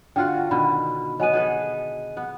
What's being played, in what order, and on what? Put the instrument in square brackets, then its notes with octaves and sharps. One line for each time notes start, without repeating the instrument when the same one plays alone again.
[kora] D3 F4 F#4 [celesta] G5
[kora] B2 D3 D#3 [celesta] B5
[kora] F#3 B3 [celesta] D#5 G#5 D#7
[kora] G#4 A4 B4
B3